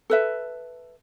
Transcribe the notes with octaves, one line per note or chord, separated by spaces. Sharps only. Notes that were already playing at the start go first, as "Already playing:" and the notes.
A4 B4 E5